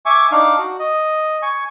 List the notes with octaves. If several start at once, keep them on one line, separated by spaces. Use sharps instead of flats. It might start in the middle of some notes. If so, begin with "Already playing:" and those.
E5 G#5 C#6 D6
D4 D#4 F5 D6
F#4
D#5
G#5 C#6